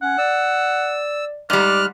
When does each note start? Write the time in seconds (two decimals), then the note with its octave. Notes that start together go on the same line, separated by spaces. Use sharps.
0.02 C#4 F#5
0.18 D5 E6
1.50 G#2 G3 D5 F6 F#6